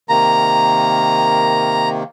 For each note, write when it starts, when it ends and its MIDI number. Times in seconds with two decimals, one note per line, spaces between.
0.09 2.03 48
0.09 2.03 51
0.09 2.03 58
0.09 1.89 82